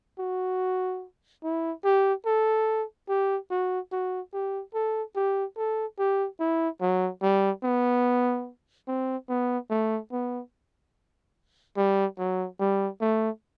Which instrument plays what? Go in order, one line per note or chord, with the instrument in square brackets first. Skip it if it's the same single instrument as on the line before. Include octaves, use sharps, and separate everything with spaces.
[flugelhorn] F#4
E4
G4
A4
G4
F#4
F#4
G4
A4
G4
A4
G4
E4
F#3
G3
B3
C4
B3
A3
B3
G3
F#3
G3
A3